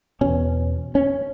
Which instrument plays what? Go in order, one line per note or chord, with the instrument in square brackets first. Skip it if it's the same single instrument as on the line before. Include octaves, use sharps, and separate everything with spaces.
[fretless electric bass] E2 B2 C#4
C#4